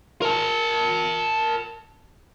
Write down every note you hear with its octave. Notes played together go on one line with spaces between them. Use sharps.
A#4 A5